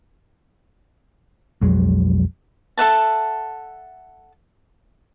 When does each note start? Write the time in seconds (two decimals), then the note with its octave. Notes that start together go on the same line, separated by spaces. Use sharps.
1.61 B1 F2 F#3 G#3
2.77 A4 E5 F#5 A5